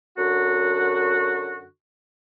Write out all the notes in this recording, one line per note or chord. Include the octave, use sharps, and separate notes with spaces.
F#2 D3 F#4